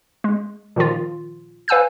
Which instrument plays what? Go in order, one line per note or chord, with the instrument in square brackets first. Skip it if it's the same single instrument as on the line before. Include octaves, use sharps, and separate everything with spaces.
[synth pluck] G#3
A#2 D#3 F3 F4
B4 F5 G#5 E6 G6